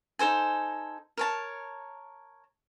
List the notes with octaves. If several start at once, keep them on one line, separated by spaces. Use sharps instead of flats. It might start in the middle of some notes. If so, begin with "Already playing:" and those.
D#4 A4 C5 G#5
A#4 C#5 A5